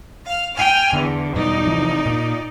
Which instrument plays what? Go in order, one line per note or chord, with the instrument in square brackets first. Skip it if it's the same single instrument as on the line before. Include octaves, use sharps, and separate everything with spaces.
[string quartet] F5 F6
G5 G#5 F6
[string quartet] E2 [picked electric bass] D3
[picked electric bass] E2 G2 B2 [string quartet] D#4 D5
[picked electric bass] C3 E3 F3
A#2